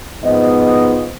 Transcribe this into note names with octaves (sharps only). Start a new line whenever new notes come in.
G#2 F3 B3 D#5